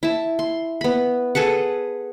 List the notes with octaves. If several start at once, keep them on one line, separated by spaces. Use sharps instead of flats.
E4 A5
C6
B3 B5
G#4 A4 B4 F#5